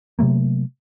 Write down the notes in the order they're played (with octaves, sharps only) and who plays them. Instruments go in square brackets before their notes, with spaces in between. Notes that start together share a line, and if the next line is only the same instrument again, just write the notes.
[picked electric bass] C3 F#3 A3 A#3